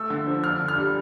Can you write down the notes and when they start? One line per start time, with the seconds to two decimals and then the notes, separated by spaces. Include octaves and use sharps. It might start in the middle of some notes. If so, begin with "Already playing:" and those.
Already playing: A3 E6
0.10 D3
0.27 F3
0.43 D4 F6
0.60 D3
0.68 F6
0.77 G3